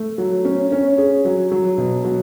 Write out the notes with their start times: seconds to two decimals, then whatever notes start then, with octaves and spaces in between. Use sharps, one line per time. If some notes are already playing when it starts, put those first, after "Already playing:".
Already playing: A3
0.18 F#3
0.45 C#4
0.72 C#4
0.98 G#4
1.25 F#3
1.52 F#3
1.78 B2
2.05 F#3